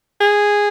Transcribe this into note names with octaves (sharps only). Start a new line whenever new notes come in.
G#4